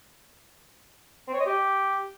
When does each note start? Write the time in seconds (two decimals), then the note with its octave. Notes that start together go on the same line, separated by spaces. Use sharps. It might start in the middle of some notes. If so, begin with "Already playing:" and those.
1.28 C4
1.34 C#5
1.40 D#5
1.46 G4